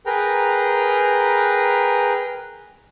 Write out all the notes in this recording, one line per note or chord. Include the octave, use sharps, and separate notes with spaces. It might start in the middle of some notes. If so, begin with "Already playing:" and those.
G#4 A#4 B4 G5 A#5